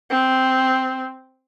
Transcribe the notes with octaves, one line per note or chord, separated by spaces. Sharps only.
C4